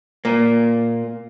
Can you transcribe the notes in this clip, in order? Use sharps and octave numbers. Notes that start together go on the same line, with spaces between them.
A#2 A#3